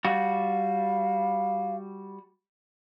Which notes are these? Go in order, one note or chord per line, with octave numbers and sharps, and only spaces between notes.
G3 F#4 F5